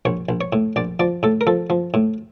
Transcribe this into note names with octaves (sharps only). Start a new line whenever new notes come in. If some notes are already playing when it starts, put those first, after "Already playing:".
A#1 C#5
A#1
C#5
A2
A#1 D5
F3 D5
A2 A4
A#4
F3 A4
F3
A2